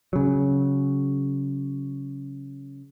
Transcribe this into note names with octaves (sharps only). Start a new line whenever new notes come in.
C#3 F#3